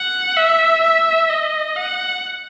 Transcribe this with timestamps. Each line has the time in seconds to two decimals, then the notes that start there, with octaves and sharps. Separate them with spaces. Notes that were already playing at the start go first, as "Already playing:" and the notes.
Already playing: F#5
0.37 E5
0.84 E5
1.30 D#5
1.76 F#5